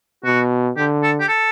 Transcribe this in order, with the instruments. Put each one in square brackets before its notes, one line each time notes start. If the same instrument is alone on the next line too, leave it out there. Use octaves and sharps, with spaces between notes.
[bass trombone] B2 [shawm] F#4
[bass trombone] D3 [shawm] G4
[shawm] A4
G4
A4